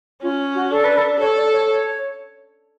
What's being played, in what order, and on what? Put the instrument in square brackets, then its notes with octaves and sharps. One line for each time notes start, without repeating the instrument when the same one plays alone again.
[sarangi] C#4 [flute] F4
[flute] F#4
[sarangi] D4 [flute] A4
[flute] B4
A4
[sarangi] A4 [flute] C#5
[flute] D5
C#5
C#5